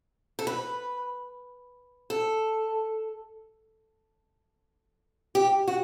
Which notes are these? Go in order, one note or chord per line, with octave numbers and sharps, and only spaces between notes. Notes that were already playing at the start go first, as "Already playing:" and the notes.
A4
B4
A4
G4
F#4